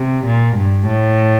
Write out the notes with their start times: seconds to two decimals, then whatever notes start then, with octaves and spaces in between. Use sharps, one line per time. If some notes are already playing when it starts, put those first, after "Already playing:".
Already playing: C3
0.25 A#2
0.56 G2
0.88 A2